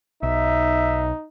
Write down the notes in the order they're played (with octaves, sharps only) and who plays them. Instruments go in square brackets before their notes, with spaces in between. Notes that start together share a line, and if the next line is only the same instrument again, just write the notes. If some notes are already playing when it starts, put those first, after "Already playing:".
[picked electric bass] B1 [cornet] D#4 [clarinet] E5